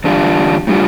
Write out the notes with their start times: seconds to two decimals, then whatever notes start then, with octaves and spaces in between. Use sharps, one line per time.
0.04 E2 D3 G3 D4 F4
0.67 A2 G3 D4 F4